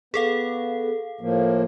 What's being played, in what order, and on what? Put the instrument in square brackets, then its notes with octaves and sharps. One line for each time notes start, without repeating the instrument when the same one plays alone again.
[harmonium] B3 [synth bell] G#4 A4 F5
[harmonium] A2 F3 A#3